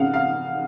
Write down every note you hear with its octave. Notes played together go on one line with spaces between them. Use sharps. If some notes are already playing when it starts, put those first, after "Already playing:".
Already playing: C#3 F5 F#5
F5